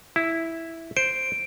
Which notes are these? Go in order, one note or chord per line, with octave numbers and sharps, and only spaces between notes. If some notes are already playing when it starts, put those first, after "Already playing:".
E4
C5 D7